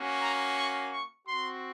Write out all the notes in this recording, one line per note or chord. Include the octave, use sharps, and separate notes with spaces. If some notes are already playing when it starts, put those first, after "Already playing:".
Already playing: A#3 C#4 F#4
A#5
C#6
C#6
C4 F#4 C6